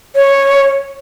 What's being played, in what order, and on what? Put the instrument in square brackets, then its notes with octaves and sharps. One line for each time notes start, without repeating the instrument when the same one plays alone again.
[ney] C#5